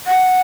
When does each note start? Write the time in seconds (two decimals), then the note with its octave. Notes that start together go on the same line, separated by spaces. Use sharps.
0.07 F#5